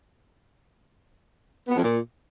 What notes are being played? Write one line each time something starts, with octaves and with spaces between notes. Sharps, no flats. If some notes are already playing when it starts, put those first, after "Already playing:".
B3
F2
A#2